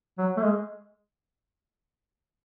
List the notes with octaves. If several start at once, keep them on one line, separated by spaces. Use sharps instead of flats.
F#3
A3
G#3